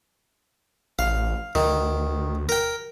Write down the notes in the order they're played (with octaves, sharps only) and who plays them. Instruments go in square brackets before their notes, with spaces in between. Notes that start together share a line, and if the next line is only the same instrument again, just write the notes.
[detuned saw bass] A1 [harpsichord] F5
[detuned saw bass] D2 [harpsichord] D#3
[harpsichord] A#4 G5